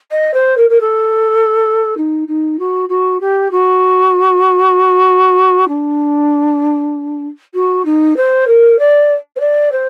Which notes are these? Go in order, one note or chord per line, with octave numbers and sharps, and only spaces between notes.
D#5
C5
A#4
A#4
A4
D#4
D#4
F#4
F#4
G4
F#4
D4
F#4
D#4
C5
A#4
D5
C5
D5
C5